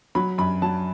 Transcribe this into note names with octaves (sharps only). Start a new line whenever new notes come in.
F#3 B5
F#2 B5
F#3 A5